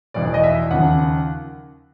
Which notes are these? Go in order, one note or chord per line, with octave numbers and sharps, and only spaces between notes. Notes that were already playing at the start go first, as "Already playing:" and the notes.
F1 E2 B2 D5
D5
D#5
E5
D#2 C#3 F3 F#5